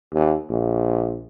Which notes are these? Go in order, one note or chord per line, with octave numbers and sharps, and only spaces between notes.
D#2
A#1